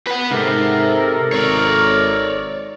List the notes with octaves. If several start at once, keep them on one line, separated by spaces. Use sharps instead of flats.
B4 F#5
G#2 C3 A4 A#4
G#1 C#5 D5